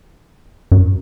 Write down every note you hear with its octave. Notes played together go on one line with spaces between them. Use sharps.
F#2